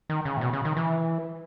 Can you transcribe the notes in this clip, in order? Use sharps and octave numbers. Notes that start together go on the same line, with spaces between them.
D#3
C#3
A2
B2
C#3
D#3
E3